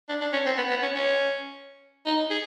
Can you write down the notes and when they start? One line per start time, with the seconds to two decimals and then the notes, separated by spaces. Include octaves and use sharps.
0.09 D4
0.21 D4
0.33 C#4
0.46 C4
0.58 B3
0.70 B3
0.83 C#4
0.96 C#4
2.06 D#4
2.31 G#4